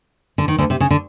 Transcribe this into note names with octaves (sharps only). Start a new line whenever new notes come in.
D3
D#3
D2 D3
C3
C#3
D3